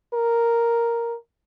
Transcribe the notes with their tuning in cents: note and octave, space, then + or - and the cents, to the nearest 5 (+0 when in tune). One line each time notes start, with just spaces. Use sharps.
A#4 +0